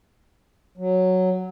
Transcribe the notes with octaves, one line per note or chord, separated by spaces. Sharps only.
F#3